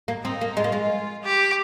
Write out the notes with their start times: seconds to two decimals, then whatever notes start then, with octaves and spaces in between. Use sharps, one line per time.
0.08 A#3
0.24 C4 D#4
0.41 A#3
0.57 G#3 F4
0.64 A#3
0.72 G#3
1.23 G4